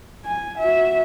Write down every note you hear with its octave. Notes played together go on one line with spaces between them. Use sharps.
G#5
F#4 E5